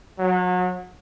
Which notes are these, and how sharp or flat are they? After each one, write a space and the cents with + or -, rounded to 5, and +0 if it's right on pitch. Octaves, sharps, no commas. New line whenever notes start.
F#3 -30